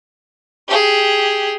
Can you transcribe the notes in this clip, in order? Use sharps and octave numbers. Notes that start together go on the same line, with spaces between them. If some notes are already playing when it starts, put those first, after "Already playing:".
G4 G#4